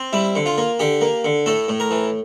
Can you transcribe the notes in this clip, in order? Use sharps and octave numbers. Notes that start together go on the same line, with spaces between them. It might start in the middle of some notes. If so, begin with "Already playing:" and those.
Already playing: C4
G3 E4
D3
F4
A#3
D3 G4
A#3
D3
A2 A4
A2
A#4
E3